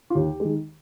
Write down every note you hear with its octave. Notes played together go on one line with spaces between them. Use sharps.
F4
D#2 G4
D#3 G#3